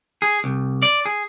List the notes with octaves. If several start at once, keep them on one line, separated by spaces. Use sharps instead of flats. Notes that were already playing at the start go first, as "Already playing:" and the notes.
G#4
C2
D5
G#4